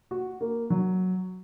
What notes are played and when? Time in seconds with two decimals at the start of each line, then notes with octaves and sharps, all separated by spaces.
0.11 F#4
0.41 A#3
0.70 F#3